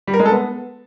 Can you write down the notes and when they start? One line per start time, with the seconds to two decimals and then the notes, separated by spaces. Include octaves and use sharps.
0.07 G3
0.13 A#4
0.20 G#3
0.26 A4
0.32 B3